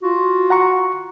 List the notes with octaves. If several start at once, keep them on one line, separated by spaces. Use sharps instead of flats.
F4 F#4
F#5 A#5 C#6